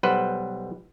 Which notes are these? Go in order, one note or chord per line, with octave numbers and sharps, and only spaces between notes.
B1 G3 B4 C5 F#5